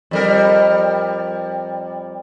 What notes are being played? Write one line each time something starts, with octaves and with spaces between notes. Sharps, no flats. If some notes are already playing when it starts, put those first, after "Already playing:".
F2 G3 A#4